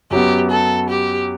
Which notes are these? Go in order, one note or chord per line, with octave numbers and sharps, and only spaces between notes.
F#2 F#3 B3 G4
A4
G4